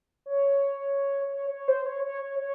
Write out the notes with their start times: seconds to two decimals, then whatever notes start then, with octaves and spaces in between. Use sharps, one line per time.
0.26 C#5
1.33 C#5
1.50 C#5
1.68 C5
1.86 C#5
2.04 C#5
2.22 C#5
2.39 C#5